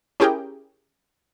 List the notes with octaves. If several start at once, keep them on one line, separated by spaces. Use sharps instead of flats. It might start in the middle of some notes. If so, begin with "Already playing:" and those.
C#4 E4 G4 G#4 A#4 G5